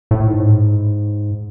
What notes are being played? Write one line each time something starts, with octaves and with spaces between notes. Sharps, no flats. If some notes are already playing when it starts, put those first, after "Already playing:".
A2
G#2